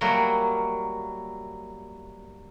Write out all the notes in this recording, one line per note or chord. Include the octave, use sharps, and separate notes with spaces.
F#3 G3 A3 A#3 F#4